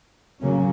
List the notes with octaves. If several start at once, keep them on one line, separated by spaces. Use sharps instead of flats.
C#3 F#3 A#3 C#4